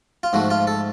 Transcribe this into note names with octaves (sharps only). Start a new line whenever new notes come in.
F4
G#2 F3 A3 F#4
F4
A4